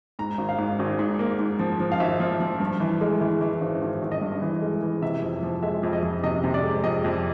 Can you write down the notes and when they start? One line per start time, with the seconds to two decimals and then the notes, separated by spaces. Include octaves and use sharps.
0.19 G#2 A#5
0.38 G#1
0.49 F5
0.58 G#2
0.79 G#1
0.99 G#2
1.19 A#3
1.39 G#2
1.59 F3
1.80 F3
1.92 F5
2.00 G#1 E5
2.20 F3
2.40 F3
2.60 G2
2.80 E3
3.01 G#3
3.21 E3
3.41 E3
3.61 G#1
3.82 G#1
4.02 G#1
4.12 D#5
4.21 G2
4.42 E3
4.61 G#3
4.83 E3
5.02 C3 E5
5.22 F2
5.43 F3
5.63 G#3 E5
5.83 F2
5.93 D#5
6.03 F2
6.23 C3 D#5
6.44 C3
6.54 D5
6.63 G#3
6.84 F2 D#5
7.04 F2